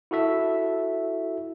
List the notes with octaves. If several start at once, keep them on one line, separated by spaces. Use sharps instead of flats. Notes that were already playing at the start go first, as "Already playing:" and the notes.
E4 F#4 A4 E5